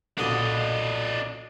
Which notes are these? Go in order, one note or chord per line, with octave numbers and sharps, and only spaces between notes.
B1 A#2 D3 D4 D#5